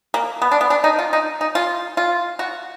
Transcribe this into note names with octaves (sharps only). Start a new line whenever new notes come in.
A#3
B3
D4
B3
D4
D#4
F4
D#4
D#4
F4
F4
F#4